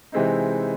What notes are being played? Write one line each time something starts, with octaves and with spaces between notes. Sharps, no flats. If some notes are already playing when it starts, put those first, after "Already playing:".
C3 E3 G#3 C4 D#4